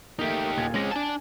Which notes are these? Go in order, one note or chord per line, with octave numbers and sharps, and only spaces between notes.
A3 A#3 D#4 G4
D#1 A#2 G#6
G#3 C4 C#4 A#6 F#7
D4 G#5 A5